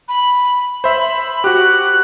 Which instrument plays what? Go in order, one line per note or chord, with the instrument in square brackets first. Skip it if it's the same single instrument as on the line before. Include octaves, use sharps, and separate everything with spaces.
[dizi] B5
[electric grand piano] C5 E5 [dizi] B5
[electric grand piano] F#4 G4 [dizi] F#6